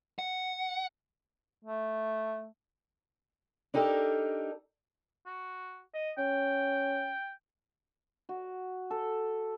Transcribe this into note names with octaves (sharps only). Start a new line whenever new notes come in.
F#5
A3
D4 D#4 G4 A4 A#4
F#4
D#5
C#4 G5
F#4
A4